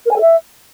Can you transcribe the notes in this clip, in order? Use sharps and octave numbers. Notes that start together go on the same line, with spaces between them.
A#4
G#5
A4
E5